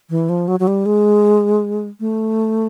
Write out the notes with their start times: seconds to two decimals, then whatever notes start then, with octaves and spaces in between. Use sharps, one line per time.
0.10 E3
0.29 F3
0.48 F#3
0.60 F#3
0.67 G3
0.86 G#3
2.00 A3